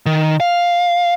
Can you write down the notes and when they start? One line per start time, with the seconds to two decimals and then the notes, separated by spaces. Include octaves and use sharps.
0.06 D#3
0.40 F5